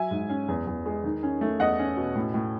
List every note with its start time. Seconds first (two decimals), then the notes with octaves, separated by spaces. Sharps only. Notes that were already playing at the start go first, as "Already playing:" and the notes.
Already playing: F#3 E5 G#5
0.11 G#2
0.29 C#4
0.48 E2
0.67 E2
0.86 G#3
1.04 D#3
1.23 C#4
1.41 A3
1.60 E2 D#5 F#5
1.79 C#4
1.97 B2
2.15 A2
2.34 A2